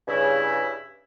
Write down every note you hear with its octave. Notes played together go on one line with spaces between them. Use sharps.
G2 C#3 E4